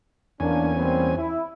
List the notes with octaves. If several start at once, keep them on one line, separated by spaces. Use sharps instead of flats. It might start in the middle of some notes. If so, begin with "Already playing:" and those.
E2 A#3 C#4 D4 G#5
G3 A#3 C4
E4